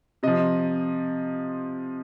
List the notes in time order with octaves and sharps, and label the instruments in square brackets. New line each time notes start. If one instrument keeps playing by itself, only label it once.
[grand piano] C3 F3 D#5